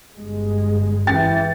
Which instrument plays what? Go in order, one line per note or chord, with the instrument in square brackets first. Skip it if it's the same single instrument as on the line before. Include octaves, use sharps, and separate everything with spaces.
[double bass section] G1 G2 G#3
[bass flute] E3 [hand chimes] G5 [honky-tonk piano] A6